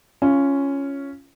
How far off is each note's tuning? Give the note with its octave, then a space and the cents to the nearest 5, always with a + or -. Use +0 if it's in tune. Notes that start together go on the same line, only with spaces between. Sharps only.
C#4 +0 F4 -20